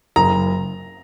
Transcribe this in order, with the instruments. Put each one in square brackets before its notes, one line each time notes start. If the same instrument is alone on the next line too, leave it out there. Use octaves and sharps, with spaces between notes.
[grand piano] F#1 [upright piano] A#5